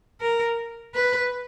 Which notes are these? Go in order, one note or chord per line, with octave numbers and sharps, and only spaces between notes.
A#4
B4